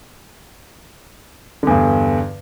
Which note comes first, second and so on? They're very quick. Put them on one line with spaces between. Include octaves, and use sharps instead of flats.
D3 E2 G2